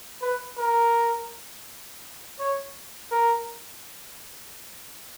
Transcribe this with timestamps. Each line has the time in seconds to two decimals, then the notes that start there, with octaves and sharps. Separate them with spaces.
0.22 B4
0.58 A#4
2.39 C#5
3.11 A#4